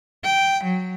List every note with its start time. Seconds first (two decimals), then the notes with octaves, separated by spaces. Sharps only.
0.24 G5
0.64 F#3